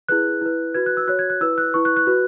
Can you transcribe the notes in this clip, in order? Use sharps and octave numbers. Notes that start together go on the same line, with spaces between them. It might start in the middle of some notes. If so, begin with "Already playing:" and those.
E4 G#4 B4 F#6
E4 B4
F#4 B4 G#6
F#6
E6
F#4 C#5 F#6
G#6
F#6
E4 B4 E6
F#6
E4 B4 C#6
F#6
F#6
F#4 B4